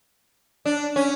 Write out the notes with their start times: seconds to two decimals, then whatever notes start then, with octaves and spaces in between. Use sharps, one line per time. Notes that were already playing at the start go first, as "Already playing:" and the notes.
0.65 D4
0.96 C#4